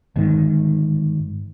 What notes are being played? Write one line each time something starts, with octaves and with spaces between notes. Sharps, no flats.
G1 G#2 D#3